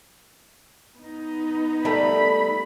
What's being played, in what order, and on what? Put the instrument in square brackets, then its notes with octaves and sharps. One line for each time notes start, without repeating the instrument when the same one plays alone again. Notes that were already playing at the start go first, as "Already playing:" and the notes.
[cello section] B3 D#4
[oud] G3 A#4 [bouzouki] A3 E5 A#5 [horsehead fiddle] B5